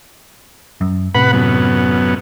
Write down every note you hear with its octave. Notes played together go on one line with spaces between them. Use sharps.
F#2
A2 C3 B4 F#5 B5
F#2 B3